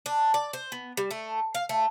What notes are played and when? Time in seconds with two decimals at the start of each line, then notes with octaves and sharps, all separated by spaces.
0.06 D4
0.34 D5
0.53 C5
0.72 B3
0.97 G3
1.11 A3
1.55 F5
1.69 A3